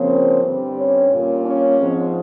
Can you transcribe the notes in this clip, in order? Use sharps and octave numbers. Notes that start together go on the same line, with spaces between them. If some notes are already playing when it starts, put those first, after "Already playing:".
Already playing: C#3 F3 A#3 C4 C#4 C5
G2 D3 G3 C4
C#4 C#5
A#2 G3 A#3 C#4
C#4 C#5
G#2 F3 G#3 C4